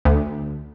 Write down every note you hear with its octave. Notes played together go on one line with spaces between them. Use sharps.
D2